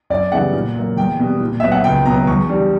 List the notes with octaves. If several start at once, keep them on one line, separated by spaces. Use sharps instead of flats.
F#2 D5
C#3 E3 G3 B3 F#5
A#2
F#3 A#3
E2 G5
B2 G3 B3
A#2
F#3 B3 E5
F#5
C#2 G5
B2 F#3 B3 A#5
E2 C#6
D3 G3